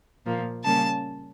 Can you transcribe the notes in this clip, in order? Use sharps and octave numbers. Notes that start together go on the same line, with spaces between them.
A#2 F3 A#3
C#3 G3 A#3 C#4 A5